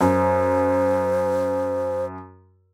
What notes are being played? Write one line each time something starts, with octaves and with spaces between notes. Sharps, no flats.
F#2 C5